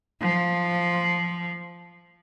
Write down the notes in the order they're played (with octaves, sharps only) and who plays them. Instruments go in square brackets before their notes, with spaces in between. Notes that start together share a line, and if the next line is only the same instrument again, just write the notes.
[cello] F3